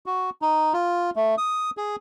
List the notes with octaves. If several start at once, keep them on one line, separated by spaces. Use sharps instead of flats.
F#4
D#4
F4
A3
D#6
G#4